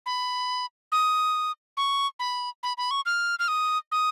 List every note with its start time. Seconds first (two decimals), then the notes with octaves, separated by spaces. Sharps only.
0.06 B5
0.92 D#6
1.77 C#6
2.19 B5
2.63 B5
2.78 B5
2.91 C#6
3.06 F6
3.39 F6
3.48 D#6
3.92 D#6